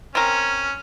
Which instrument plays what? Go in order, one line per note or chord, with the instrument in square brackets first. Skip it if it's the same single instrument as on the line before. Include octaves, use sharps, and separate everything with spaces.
[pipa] C4 A#4 [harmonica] C#4